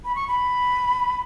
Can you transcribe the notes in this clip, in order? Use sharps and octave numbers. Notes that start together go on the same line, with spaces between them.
B5
C#6
B5